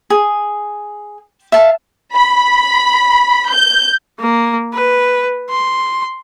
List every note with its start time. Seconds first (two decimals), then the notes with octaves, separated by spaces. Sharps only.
0.10 G#4
1.52 E5 F5 A5
2.15 B5
3.52 G6
4.20 A#3
4.73 B4
5.50 C6